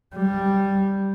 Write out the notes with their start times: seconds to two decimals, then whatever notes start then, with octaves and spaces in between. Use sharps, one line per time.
0.15 G3